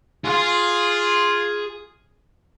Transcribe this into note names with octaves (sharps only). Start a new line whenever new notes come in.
F4 G#4